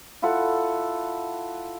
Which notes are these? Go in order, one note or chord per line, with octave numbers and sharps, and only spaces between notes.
E4 F4 A4 F#5